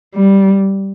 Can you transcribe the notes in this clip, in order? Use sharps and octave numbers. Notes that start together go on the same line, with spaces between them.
G3